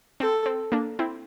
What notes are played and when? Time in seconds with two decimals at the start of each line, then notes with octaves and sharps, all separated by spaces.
0.20 C4 A4
0.46 C4
0.72 A#3 D4
0.99 C4 E4